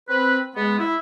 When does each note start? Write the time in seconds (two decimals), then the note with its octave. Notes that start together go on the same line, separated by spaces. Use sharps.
0.08 C4 B4
0.56 G#3 B3
0.78 E4